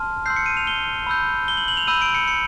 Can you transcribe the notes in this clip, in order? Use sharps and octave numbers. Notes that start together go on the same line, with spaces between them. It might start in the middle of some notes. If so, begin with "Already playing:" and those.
Already playing: A5 C6 F6
C6 E6 G6 C7
C#7
D#7
F7
G7
B5 E6 G6
G7
F#7
F#7
F7
B5 E6 G6 D#7
D7
C#7
C#7